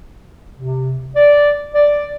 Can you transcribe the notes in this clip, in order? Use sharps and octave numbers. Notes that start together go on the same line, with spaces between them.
C3
D5
D5